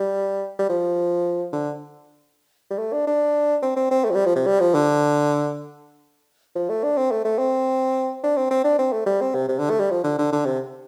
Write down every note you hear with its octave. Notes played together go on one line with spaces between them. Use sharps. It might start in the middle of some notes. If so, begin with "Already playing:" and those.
Already playing: G3
G3
F3
D3
G3
A3
D4
D4
C4
C4
C4
A3
F3
G3
F3
C3
G3
F3
D3
F3
A3
D4
C4
A3
A3
C4
D4
C4
C4
D4
C4
A3
G3
C4
C3
C3
D3
A3
G3
F3
D3
D3
D3
C3